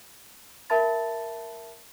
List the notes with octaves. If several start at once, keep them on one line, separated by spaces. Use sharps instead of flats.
A#4 E5 A5 B5 A6